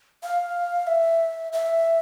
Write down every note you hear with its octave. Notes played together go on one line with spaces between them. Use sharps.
F5
E5
E5